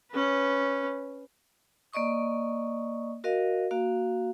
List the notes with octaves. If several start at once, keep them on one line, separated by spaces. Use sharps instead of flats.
C#4 B4
A#3 D5 D#5 C#6 D#6
F#4 A#4 D#5 F5
A#3 F#4 F5